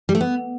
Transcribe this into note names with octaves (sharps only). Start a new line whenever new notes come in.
G3
A3
B3